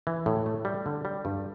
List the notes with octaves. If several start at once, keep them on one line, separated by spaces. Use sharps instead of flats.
E3
A2
A3
G3
D3
G3
G2